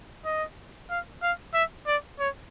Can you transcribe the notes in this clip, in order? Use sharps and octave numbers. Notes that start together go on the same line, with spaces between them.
D#5
F5
F5
E5
D5
C#5